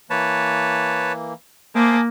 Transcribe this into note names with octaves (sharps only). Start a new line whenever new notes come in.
E3 A#3 B4 C#5 A5
A#3 C5 E5 G#5 A5 D6 D#6